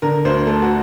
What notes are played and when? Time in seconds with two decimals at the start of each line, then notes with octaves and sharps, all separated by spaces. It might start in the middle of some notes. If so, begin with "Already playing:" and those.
0.02 D3 A#4
0.25 D2 C5
0.47 A3 A4
0.62 F#4